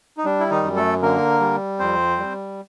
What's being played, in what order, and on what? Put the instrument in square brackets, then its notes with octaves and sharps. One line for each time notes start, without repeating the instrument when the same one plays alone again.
[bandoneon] D#4
G3 D4
E4
D#3 D#4
F#2
A3 A4
D3 A#3 A#4
G3
F2 C4 C5
G3